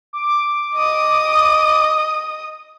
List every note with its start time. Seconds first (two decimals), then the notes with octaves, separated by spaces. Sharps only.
0.13 D6
0.76 D#5 D#6